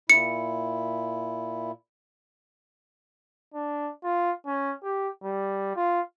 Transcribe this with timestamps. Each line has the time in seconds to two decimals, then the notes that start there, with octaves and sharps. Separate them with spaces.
0.10 A#2 E4 C#7
3.54 D4
4.04 F4
4.46 C#4
4.83 G4
5.23 G3
5.76 F4